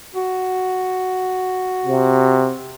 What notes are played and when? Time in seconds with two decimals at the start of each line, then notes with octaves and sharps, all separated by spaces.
0.15 F#4
1.85 C3